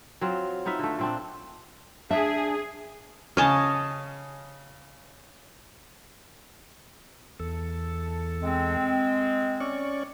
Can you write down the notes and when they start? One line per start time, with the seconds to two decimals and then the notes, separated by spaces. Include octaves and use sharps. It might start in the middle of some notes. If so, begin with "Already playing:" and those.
0.21 F#3 C4 F4
0.66 B3 D#4 F4 E5
0.79 D3 A3
0.99 A#2 C4 D4
2.11 D4 G#4 E5
3.37 C#3 C#5 D#5 G#5 A5 F6
7.40 E2 A4
8.42 G#3 C4
9.60 C#4 D5 C#6